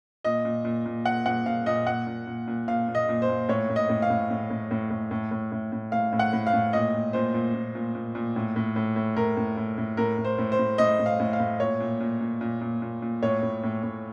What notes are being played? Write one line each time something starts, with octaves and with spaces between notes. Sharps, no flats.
A#2 D#5
A#2
A#2
A#2
A#2 F#5
A#2 F#5
A#2 F5
A#2 D#5
A#2 F#5
A#2
A#2
A#2
A#2 F5
A#2
D#5
A#2
C5
A#2
A2 C#5
A2
D#5
A2
F5
A2
A2
A2
A2
A2
A2
A2
A2
A2
A2 F5
A2
F#5
A2
F5
A2
A#2 D#5
A#2
A#2 C5
A#2
A#2
A#2
A#2
A#2
A2
A2
A2
A2
A2 A#4
A2
A2
A2
A2 A#4
A2
C5
A2
C5
A2
A2 D#5
A2
F5
A2
F5
A2
A#2 C#5
A#2
A#2
A#2
A#2
A#2
A#2
A#2
A2 C#5
A2
A2
A2